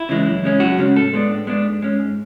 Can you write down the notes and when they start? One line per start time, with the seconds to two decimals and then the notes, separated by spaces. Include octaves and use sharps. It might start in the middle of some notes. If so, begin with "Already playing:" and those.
Already playing: E4
0.09 C#3 E3 G#3
0.26 F#2
0.43 C#3 G#3 C#4
0.60 F#2 F#4
0.78 C#3 G#3 C#4
0.96 A2 A4
1.13 G#3 B3 D4
1.30 A2
1.47 G#3 B3 D4
1.65 G#2
1.82 G#3 C#4
1.99 G#2